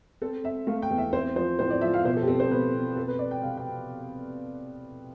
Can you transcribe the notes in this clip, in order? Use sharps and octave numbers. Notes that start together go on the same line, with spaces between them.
C4 A4
C4 E5
A3 F5
G5
E2
E5
C4 C5
F3 C5
A2 C5
D5
F3 E5
F5
B2 C5
A4
G4
C4 A4
C5
B2 B4
B2
F2 A4
B4
F2 D5
G5
C3 F5
G5